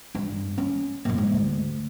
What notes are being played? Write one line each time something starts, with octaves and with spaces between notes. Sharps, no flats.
G2
C#4
F#2 A#2
G#2
D2